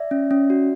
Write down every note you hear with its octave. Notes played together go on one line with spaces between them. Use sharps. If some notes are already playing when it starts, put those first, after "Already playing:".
Already playing: D5 E5
C#4
C#4
F#4